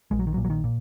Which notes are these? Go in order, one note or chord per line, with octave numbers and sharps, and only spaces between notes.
A#1 G#3
F#3
D#3
F#3
A#2
F#3
D#3
A#2